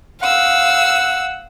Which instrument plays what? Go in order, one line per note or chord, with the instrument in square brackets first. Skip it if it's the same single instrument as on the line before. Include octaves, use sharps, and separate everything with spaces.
[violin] F5 E6 [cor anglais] F#5